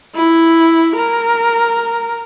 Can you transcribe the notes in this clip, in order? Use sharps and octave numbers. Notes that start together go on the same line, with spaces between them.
E4
A#4